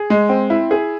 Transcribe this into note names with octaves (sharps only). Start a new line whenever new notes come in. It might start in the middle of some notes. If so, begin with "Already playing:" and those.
Already playing: G#4
G#3
C4
E4
G#4